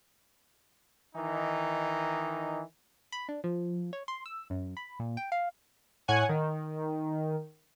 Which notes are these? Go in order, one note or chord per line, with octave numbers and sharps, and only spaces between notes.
D#3 E3 D#4
B5
D4
F3
C#5
C6
E6
F#2
B5
A#2
G5
F5
A2 C#5 F#5 G#5 G#6
D#3